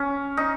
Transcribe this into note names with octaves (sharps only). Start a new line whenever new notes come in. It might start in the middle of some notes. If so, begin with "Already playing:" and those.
Already playing: C#4
D#4